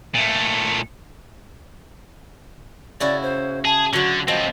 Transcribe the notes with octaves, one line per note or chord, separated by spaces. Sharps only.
A#2 A3
C#3 E4 F#4 D5
C5
G#4 A5
D3 F#3 F#4 C#5
A2 F3 C4 D#5